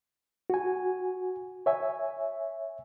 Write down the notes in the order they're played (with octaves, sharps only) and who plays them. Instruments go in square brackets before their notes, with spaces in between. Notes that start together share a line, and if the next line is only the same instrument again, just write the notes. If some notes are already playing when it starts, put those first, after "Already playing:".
[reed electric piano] F#4 G#5
C#5 E5 G#5